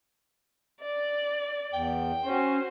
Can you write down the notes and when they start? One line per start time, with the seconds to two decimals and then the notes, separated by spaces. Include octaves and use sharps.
0.81 D5
1.73 E2 G5
2.25 C#4 F#4 C5